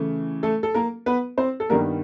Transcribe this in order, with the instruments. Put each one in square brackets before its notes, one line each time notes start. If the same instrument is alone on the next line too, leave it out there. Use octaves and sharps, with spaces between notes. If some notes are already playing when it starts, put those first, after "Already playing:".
Already playing: [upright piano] C#3 E3 A3
A3 A4
A4
A#3 A#4
B3 B4
C4 C5
A4
G2 D#3 G3 A#3 B3 A#4